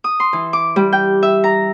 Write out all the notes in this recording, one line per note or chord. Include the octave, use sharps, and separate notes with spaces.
D#6
C6
E3
D6
G3
G5
E5
A#5